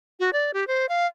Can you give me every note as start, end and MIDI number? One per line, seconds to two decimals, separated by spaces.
0.20 0.30 66
0.33 0.51 74
0.54 0.67 67
0.67 0.86 72
0.89 1.06 77